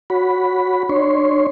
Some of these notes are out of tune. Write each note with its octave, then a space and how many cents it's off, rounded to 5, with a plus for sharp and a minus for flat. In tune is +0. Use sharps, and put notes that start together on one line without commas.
F#4 -10 C#5 +0 B5 +0
D4 +30 C#5 +0 C6 +0